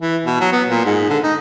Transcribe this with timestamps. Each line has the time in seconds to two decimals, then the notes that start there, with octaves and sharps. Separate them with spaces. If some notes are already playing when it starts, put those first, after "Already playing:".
0.01 E3
0.26 B2
0.41 F#3
0.53 B3
0.69 A#2
0.85 G#2
1.10 D3
1.24 D#4